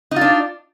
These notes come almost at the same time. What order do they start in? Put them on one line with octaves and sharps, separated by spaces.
D#4 F4 D4